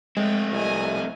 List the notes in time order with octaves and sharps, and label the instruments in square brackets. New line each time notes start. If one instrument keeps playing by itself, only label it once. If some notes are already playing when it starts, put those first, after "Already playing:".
[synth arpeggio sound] G#3 [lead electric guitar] A3 C4 [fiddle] G5
[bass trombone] C2 [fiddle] D#5 G#5